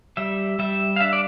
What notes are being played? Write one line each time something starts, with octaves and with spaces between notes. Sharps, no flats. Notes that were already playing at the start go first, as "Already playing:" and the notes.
G3 E5
G3 E5
F5
D4 E5
D5